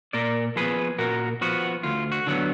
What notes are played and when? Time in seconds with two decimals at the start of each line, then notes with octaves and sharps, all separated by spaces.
0.13 A#2 A#4 D5
0.56 F3 B3 G#4 B4
0.98 A#2 F#4 A#4
1.41 F3 B3 F#4
1.83 D2 F4
2.12 F#4
2.27 D3 F#3 B3